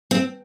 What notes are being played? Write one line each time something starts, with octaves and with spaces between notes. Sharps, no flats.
C4